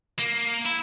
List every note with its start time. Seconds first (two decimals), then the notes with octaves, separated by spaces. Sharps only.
0.19 A#3
0.65 E4